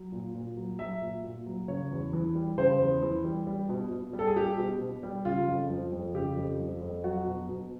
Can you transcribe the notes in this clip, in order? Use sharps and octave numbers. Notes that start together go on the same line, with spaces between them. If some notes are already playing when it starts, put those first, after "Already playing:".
Already playing: F#3
A#2
A#2
F#3
F#3 E5
A#2
A#2
F#3
C#3 C#5
E2
E3
G3
C#3 C5
E2
E3
G3
G3
B2
B2
G3
A4
G#4
G3 G4
B2
B2
G3
C#3 F4
F2
F3
F2
C#3 G4
F2
F3
F2
F#3 F#4
B2
B2